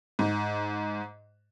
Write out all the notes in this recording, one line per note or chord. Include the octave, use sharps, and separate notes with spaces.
G#2